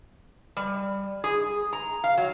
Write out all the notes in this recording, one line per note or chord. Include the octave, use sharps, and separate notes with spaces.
G3
G#4
A#5
F5
F#3